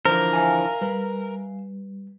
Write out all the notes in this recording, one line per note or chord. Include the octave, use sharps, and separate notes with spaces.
D3 E3 F3 A#4 C5
E5 F5 G#5
G3 B4